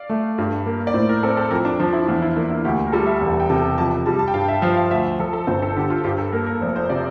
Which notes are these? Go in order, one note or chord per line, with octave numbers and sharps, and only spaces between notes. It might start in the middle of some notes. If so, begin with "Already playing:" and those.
Already playing: D5 F5
A3
G2
A#3
D5
A2 C5
A#4
C4 A4
A4
F2 A#4
D4
F3 D4
E4
E2 F4
E4
A#3 D4
E4
D2 G4
G4
A#4
G3 A4
E5
E1
G5
C3 A5
F2 A5
G3 A5
A5
G5
G2 F5
E5
F3 F5
F5
D2 E5
F3 A4
A4
G1 C5
A4
D3 G4
F4
G2 G4
A4
A#3 A#4
A#4
F1 C5
C5
C3 D5